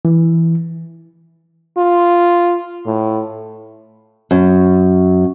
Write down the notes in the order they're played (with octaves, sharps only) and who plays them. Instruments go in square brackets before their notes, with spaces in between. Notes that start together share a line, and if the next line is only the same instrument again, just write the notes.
[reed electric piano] E3
[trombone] F4
A2
[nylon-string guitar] F#2